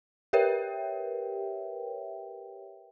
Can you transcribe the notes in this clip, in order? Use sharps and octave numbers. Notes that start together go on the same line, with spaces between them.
G4 A#4 B4 C#5 E5 G5